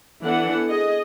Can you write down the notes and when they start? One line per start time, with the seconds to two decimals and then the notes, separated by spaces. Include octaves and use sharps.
0.23 E3 B3 D4 A4 F#5
0.69 G#4 D#5